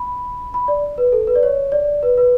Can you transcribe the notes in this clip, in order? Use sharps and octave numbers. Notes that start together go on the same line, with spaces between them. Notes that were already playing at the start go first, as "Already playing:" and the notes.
Already playing: B5
B5
D5
B4
A4
B4
D5
C#5
D5
B4
B4